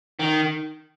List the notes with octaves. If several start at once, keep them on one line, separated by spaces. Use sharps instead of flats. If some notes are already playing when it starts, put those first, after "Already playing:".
D#3